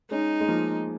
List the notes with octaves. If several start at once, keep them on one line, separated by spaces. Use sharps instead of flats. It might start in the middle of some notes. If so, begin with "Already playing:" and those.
G#3 C#4 D#4
G#3
F3 A#3